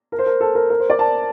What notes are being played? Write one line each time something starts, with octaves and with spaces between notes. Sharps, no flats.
A#4
C5
A#4
A4
A#4
A#4
C5
D5
A5